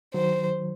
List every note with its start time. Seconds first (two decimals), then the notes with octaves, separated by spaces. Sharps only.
0.14 D#3 F#3 C5